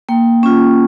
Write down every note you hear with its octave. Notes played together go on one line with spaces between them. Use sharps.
A#3 G5
C#4 F4